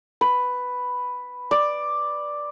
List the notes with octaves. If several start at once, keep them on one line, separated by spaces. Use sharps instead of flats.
B4
D5